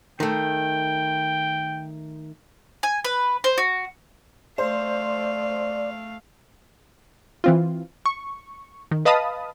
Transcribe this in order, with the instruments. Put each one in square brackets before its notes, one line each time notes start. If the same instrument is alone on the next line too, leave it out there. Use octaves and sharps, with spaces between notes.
[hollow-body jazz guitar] D#3 A3 [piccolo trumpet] G5
[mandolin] G#5
B4
C5
F#4
[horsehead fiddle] A3 F5 [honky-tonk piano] C5 [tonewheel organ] D5
[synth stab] E3 C4 F4
C#6
D#3
B4 D#5 F5 A5 B5 D#6